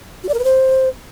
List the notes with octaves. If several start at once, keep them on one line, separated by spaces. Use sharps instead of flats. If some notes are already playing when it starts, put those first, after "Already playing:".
F#4
D5
A#4
B4
C5